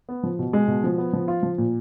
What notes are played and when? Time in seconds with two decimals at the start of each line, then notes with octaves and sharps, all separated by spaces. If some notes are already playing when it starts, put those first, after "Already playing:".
0.09 B3
0.23 F3
0.39 B2
0.53 G#3
0.68 B2
0.84 F3
0.98 B3
1.13 F3
1.28 F4
1.43 F3
1.58 A#2